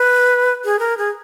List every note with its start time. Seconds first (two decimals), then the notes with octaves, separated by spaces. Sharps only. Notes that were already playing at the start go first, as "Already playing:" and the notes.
Already playing: B4
0.64 G#4
0.79 A#4
0.98 G#4